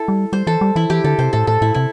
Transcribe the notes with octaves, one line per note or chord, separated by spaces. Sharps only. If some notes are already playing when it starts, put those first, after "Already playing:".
Already playing: E4 A4
G3
G3 C5
E3 A4
G3
E3 E4
E3 G4
D3 A4
C3 C5
A2 A4
A2 A4
A2 E4
C3 E4